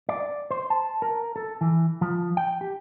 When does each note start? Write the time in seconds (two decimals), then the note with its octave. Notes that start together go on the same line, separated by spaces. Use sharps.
0.09 D5
0.51 C5
0.70 A5
1.02 A#4
1.36 A4
1.61 E3
2.01 F3
2.37 G5
2.61 G4